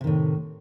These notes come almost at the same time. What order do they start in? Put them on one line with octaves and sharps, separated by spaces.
C3 D#3 A2